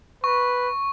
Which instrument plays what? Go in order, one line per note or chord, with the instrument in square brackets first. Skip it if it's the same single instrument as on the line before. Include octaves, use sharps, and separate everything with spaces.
[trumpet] B4 [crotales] C#6